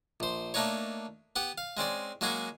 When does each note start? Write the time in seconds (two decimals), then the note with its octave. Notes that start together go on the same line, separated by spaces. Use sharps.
0.20 A#1 C5
0.54 A3 A#3 D4 D#4 C#5
1.36 B3 G4 F#5
1.58 F5
1.77 G#3 C4 C#4 D5
2.21 F#3 G#3 A#3 C#4 F#4 G#4